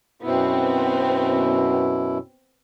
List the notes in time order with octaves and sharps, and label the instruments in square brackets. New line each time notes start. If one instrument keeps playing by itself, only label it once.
[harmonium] F#2 B2 E4 [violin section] B3 C4